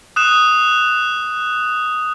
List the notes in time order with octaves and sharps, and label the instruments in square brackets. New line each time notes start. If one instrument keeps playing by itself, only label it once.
[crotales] D#6 F#6 E7